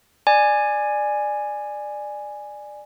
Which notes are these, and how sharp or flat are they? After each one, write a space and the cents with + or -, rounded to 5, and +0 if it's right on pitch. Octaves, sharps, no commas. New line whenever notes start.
D5 +20 G#5 +0